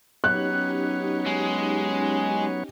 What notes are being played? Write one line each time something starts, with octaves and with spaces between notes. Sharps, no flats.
F#3 B3 C#4 D#4 G4 C#5 F#6
G#3